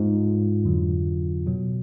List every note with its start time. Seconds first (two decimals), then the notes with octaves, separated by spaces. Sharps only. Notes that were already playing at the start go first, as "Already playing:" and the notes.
Already playing: G#2 G#3 F4
0.64 F2 D3 F#3
1.46 B2 F#3